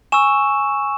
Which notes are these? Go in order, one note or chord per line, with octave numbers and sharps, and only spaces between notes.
G#5 C#6 E6 E7